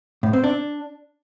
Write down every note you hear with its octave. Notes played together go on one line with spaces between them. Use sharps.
A2
C4
D4